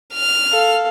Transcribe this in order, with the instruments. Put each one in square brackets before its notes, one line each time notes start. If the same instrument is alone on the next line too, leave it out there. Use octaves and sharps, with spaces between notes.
[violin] F6
[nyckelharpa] A4 F5